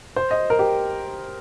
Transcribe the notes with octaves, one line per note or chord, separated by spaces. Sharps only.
C5
D#5
A#4
G4